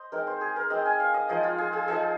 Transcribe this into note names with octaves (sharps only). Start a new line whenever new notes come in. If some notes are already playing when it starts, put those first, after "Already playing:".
Already playing: C5 D#5
G#3 C4 D#4 A#4
C5
G#4
A#4
G#3 C4 D#4 D#5
G#5
F5
D#5
F3 G#3 D#4 D#5
F4
G#4
G#4
F3 G#3 D#4 G#4